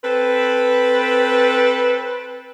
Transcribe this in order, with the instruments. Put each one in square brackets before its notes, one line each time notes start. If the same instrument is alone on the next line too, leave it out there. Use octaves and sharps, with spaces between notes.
[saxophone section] C4 A4 B4